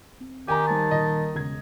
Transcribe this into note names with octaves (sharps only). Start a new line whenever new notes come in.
C4
D#3 G4 G#5 A#5
G3 D#4 C5 A5
D#1 D#2 D#5
E1 C#3 G#6